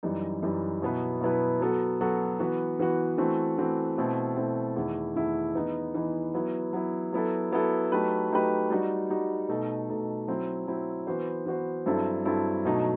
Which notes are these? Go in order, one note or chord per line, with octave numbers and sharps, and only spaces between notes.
F#2 E3 G3 D#4
F#2 E3 G3 D#4
B2 F#3 B3 E4 B4
B2 F#3 B3 E4 B4
F#3 B3 F#4 A4
F#3 B3 F#4 A4
E3 B3 F#4
E3 B3 F#4
E3 A3 C4 F#4
E3 A3 C4 F#4
B2 A3 C4 E4
B2 A3 C4 E4
E2 D#3 A3 E4
E2 D#3 A3 E4
E3 B3 D#4
E3 B3 D#4
F#3 B3 E4
F#3 B3 E4
F#3 B3 E4 A4
F#3 B3 E4 A4
F#3 A3 D#4 G4 B4
F#3 A3 D#4 G4 B4
G3 D#4 F#4
G3 D#4 F#4
B2 A3 D#4 A4
B2 A3 D#4 A4
F#3 C4 E4
F#3 C4 E4
E3 B3 F#4 C5
E3 B3 F#4 C5
G2 F#3 C4 E4 A4
G2 F#3 C4 E4 A4
B2 F#3 A3 D#4